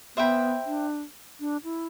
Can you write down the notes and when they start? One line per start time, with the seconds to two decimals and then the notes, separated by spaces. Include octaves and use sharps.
0.16 B3 C5 E5 G5 B5
0.66 D4
1.40 D4
1.64 E4